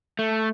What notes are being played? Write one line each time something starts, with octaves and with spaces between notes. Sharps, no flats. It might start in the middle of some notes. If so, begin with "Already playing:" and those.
A3